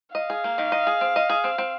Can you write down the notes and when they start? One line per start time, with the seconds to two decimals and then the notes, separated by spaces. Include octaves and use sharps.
0.15 D#5 F5
0.30 G#4
0.44 A#3
0.58 D#3
0.72 D#5
0.87 G#4
1.01 C4
1.16 D#5
1.30 G#4
1.44 C4
1.58 C4